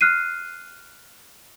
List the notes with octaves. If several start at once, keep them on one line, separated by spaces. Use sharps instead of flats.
F6 F#6 C7 D#7